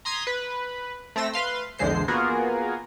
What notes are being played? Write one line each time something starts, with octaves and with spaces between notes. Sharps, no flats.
A#5 C6 D#6 G#6 B6
B4
A3 C4 E6 A#6
B4 F5 C6
A#1 E2 D3 G#3 C5 C7
A#3 B3 F4 F#4 G#4 A#4